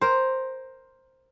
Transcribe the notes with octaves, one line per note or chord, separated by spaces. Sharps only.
A#4 C5